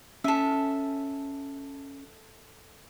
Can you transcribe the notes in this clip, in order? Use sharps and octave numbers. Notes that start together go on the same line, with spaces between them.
C#4 A4 E5 G#5 A5